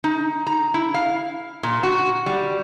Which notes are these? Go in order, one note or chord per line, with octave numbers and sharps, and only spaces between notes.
D#4
A#5
E4
F5
A#2
F#4
G3